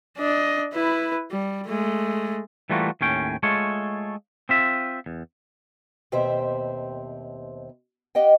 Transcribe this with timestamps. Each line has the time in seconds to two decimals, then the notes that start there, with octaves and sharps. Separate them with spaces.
0.18 D4 D#5
0.74 E4 B4
1.31 G3
1.67 G#3 A3
2.70 E3 G3 A3 A#3 F4 F#4
3.01 D#2 A2 C#4 G5
3.43 G#3 A3 F4 C#5
4.49 C4 F4 E5
5.06 E2
6.12 D#2 B2 C4 G4 C5 E5
8.15 G4 D#5 F#5 G5